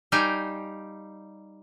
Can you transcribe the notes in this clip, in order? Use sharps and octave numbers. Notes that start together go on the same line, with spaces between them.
G3 D#4 G4 F5 G5 G#5